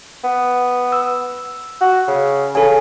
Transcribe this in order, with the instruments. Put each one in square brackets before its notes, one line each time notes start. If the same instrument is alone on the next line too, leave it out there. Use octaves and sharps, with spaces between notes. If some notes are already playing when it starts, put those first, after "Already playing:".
[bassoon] B3
[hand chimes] E6
[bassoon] F#4
C#3
[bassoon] C#3 [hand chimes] A4 G#5